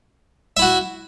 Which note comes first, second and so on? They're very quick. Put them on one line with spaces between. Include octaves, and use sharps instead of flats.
E5 E4 F#4